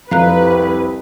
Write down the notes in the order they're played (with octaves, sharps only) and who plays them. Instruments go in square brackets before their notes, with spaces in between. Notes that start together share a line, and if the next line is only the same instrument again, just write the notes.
[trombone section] C2 [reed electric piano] F2 [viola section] B4 [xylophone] F5 A#5 F#6